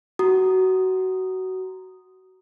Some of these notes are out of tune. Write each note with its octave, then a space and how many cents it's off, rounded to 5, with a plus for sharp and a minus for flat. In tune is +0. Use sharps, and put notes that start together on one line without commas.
F#4 +20 A#5 +0 D#6 -5